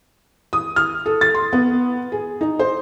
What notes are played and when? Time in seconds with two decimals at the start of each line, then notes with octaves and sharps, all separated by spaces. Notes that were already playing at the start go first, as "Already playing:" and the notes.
0.53 D#6
0.76 F6
1.06 A4
1.21 A6
1.34 C6
1.53 B3
2.12 G#4
2.41 D#4
2.59 C5